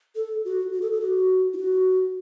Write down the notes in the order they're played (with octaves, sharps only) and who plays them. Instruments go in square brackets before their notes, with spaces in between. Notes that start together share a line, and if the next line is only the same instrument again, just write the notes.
[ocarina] A4
F#4
F#4
A4
A4
F#4
E4
F#4